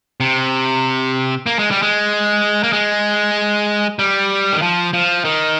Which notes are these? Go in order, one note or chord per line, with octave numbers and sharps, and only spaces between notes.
C3
A#3
G#3
G3
G#3
A#3
G#3
G3
D#3
F3
F3
D#3